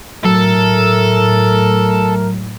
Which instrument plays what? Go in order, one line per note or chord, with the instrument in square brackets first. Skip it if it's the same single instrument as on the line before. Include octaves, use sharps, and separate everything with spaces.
[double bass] A2 [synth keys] F#3 [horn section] A3 A#4 [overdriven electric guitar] A4